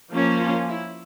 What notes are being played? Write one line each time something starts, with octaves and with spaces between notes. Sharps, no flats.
F3 A#3 C#4
F4
E4